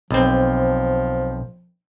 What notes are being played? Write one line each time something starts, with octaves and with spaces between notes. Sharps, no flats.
B1 F3 C4